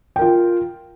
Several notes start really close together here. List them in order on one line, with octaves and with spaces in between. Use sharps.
G5 A#4 F4